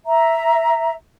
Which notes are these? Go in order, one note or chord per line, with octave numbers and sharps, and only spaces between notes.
E5 A#5